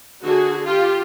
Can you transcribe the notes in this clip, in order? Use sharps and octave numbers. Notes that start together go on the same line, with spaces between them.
D3 F#4 G#4
F4 G4